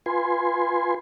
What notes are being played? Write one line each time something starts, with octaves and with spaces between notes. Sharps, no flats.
F4 B4 G#5 C6